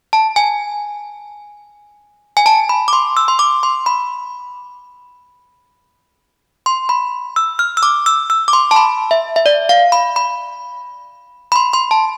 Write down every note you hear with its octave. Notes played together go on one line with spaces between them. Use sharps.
A5
G#5
G#5
A5
B5
D6
C6
E6
C6
D6
C6
B5
C6
B5
E6
F6
E6
D6
E6
E6
D6
C6
A5
B5
E5
E5
D5
F5
B5
B5
B5
C6
C6
A5